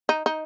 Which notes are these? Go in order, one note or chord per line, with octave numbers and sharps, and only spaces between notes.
D#4
D#4